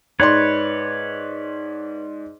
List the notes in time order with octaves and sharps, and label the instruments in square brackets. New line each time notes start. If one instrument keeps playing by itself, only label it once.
[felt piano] G#2 D5 C6 [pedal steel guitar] B4 C#5